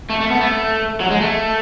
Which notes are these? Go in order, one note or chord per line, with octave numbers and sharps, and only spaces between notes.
A3
A3
B3
A3
F#3
G#3
A3